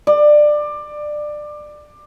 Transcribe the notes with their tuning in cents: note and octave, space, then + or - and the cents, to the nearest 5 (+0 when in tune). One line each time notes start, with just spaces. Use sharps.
D5 +20